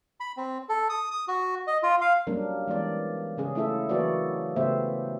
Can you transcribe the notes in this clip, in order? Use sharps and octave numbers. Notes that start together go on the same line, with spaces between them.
B5
C4
A4
D#6
D#6
F#4
D#5
F4
F5
F#3 G3 A#3 C#4 D4 A#4
E3 G#3 B3 D5
C#3 C#4 G#4
A3 C#4 E4 F4 A4 E5
E3 F#3 A#3 F#4 B4 D5
C#3 A3 B3 G4 C5 E5